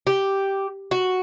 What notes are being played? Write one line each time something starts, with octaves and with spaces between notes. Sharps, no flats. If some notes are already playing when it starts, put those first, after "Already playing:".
G4
F#4